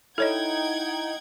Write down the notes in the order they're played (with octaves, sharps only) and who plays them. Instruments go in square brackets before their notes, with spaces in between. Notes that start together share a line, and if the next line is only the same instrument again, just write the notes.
[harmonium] D#4 [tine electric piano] E4 [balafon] A4 C#5 D#5 [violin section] F#5 G5 G#6